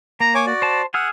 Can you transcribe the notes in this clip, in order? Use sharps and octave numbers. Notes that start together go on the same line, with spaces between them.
A#3 A#5
C#5 G#5 D6
F#4 D5
C5 A5
G#4 F#5 E6 F6